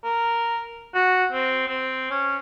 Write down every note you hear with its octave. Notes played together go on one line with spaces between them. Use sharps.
A#4
F#4
C4
C4
C#4